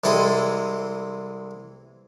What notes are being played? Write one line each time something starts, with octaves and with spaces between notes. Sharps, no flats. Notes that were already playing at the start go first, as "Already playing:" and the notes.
C2 E3 G#3 C4 A4 D#6